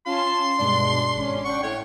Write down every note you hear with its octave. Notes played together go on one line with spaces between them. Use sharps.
C#4 F4 A5 C6
G2 B2 G#3 D4
G#1 C#4
F#5 G5 C#6
A2 C#5